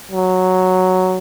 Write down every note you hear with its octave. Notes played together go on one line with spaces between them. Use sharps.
F#3